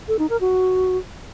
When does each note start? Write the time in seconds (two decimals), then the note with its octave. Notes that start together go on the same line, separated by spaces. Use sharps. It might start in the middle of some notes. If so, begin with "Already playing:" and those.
0.08 A4
0.19 D#4
0.30 A#4
0.41 F#4